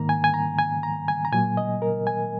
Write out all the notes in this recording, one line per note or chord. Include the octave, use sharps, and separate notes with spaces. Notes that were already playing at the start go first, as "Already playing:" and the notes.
Already playing: G#2 D#3 A#3 A#5
G#5
G#5
A#5
G#5
A#5
G#5
A#5
A#2 F#3 A#3 G#5
D#5
A#4
G#5